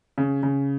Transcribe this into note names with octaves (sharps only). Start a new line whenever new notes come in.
C#3
C#3